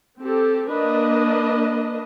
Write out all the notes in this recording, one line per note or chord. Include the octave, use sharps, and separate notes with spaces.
C4 G4 A4
A#3 D4 A#4 B4 D#5